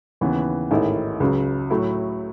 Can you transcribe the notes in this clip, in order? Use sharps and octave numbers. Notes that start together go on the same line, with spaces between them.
D#2 C#3 E3 B3
A1 G#2 D#3 A3 E4
C#2 C#3 F#3
A2 F#3 A3 E4